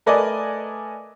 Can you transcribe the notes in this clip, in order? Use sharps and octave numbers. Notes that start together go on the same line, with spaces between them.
A3 A#4 B4 D5 D#5 G#5